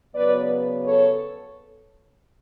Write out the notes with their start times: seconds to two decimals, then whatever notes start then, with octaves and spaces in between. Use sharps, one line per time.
0.14 C#3 F#3 B3 B4 D5
0.86 A4 C#5